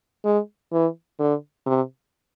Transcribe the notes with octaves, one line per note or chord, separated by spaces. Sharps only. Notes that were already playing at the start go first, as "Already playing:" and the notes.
G#3
E3
D3
C3